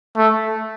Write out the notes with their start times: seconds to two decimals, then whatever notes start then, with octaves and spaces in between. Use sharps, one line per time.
0.17 A3